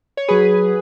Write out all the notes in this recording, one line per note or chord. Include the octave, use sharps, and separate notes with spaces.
C#5
F#3 G#4 B4